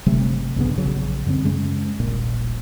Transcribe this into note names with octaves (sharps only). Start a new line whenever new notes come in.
G1 C3 F#3 A3
A#1 G2 C#3 B3
A#1 C#3 F#3
F#2 D3 C4
F#2 C#3 G#3 C#4
D#1 A#1 A#2